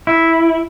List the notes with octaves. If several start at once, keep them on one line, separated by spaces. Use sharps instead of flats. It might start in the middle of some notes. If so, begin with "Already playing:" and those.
E4